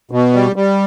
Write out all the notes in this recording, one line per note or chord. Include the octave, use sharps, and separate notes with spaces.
B2
G3
G3